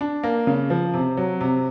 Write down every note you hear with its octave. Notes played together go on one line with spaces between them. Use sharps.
D4
A#3
C#3
F3
C3
F#3
C3